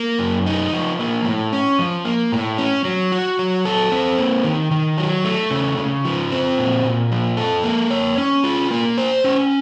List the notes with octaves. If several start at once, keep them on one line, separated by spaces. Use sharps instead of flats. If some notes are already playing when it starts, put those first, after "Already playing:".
Already playing: A#3
F#2
D#4
F3
A#3
A2
C#4
F3
A#3
A2
C#4
F#3
F#4
F#3
A4
C4
A#3
D#3
D#3
F#3
A3
C#3
C#3
F3
C4
A#2
A#2
F3
A4
A#3
C#5
C#4
F4
A#3
C5
C#4